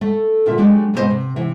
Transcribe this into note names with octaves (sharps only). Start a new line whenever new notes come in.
A3 A4 E5
A#2 D3 F4 E5
F#3 G#3 A3 D4 G4
G#2 C3 B3 D#4 C5 D#5
C3
C3 E3 E5